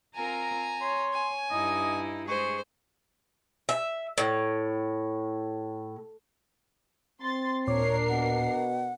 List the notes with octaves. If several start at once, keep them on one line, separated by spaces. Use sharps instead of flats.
C4 F4 A#4 G#5 A#5
C#5 C6
G#5
G2 D#4 E4 D#5
G#3 G#4 C5 C#6
E5
A2
C4 C6 A6
D#2 A#2 D4 A#4 C#5 D6 C7
B2 F#5